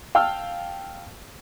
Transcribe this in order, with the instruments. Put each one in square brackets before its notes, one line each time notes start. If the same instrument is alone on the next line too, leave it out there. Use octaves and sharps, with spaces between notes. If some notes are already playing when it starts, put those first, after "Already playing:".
[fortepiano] F5 G5 A5 E6 F6